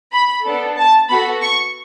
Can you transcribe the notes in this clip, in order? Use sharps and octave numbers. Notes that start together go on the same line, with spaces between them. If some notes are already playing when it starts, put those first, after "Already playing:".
B5
B3 D4 A4
A5
B3 F#4 A4 B5
C#6